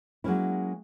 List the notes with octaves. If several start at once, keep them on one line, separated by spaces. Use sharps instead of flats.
F#3 G#3 A#3 C#4 E4